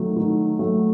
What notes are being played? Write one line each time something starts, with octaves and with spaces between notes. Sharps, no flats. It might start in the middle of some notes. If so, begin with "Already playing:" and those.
Already playing: D#3 F#3 A3
D#3
F#3 A3